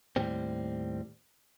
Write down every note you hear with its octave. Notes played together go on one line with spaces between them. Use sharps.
D#2 A2 G3 C4